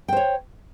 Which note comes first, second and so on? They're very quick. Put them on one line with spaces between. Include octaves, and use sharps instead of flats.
G5 C5 C#5